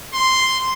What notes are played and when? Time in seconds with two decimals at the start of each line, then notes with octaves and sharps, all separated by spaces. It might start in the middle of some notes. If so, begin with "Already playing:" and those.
0.15 C6